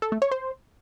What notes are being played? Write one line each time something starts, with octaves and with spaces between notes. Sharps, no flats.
A4
A3
C#5
C5